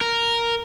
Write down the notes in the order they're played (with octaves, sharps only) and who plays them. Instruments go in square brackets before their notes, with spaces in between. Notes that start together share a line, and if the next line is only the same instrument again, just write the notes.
[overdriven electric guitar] A#4